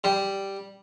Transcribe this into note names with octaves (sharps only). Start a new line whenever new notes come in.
G3